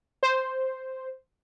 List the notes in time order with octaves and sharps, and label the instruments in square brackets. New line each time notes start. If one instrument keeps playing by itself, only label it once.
[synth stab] C5